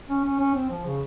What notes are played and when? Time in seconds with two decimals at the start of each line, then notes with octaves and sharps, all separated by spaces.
0.09 C#4
0.25 C#4
0.39 C#4
0.55 C4
0.70 F3
0.85 C#3